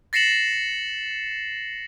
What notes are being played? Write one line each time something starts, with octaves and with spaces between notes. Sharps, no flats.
A6 A#6 C7 C#7 E7 F#7